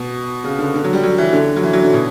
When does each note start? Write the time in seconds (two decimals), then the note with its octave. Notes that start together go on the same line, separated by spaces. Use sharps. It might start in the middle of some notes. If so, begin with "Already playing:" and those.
Already playing: B2
0.44 C#3
0.59 D3
0.74 D3
0.84 F#3
0.93 G3
1.03 F#3
1.18 E3
1.33 D3
1.56 F#3
1.63 E3
1.73 F#3
1.83 D3
1.93 B2